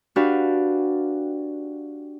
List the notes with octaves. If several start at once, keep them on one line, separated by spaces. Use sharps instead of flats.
D4 F#4 G4 B4 F5 G5